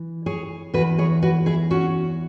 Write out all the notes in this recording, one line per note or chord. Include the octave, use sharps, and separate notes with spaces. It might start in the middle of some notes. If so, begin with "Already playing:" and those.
Already playing: E3
G#4 C#5
E2 E3 F#4 B4
G#4 C#5
F#4 B4
E4 G#4
C#4 F#4